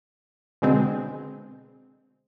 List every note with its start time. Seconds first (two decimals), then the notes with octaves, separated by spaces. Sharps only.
0.62 B2 D3 G#3 C4